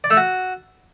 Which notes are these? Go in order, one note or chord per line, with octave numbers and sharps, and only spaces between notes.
D5
A3
F#4